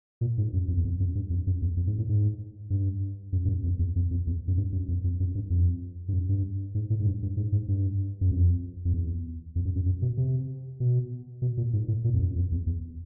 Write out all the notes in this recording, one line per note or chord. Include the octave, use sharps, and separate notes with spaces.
A#2
G#2
F#2
F2
E2
F2
F#2
G2
F2
F#2
E2
F2
G#2
A2
G#2
G2
F#2
G2
F#2
F2
E2
F2
F2
E2
F#2
G2
F#2
F2
F2
F#2
G2
F2
G2
F#2
G2
G#2
A2
G#2
G2
G2
G#2
G#2
G2
F#2
F2
F2
E2
F2
F#2
F#2
F#2
B2
C3
B2
B2
A#2
G#2
A2
A#2
F2
F#2
F2
E2
E2